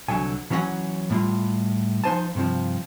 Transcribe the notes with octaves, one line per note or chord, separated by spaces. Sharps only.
C2 D3 F#3 G#5
E3 F#3 C#4 E4 F#5 G#5
A2 G3 F4
F3 D#4 C5 G#5 A5
G2 C3 F3